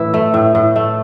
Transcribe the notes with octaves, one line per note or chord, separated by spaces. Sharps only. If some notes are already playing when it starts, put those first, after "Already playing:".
Already playing: A2 E3 E4
A3
A2
A2
A3